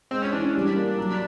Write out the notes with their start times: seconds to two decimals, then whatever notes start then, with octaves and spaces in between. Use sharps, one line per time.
0.11 G#3 C4
0.22 C#4
0.32 E3 D4
0.43 C#4
0.54 G3 D4
0.76 A#3
0.98 F#3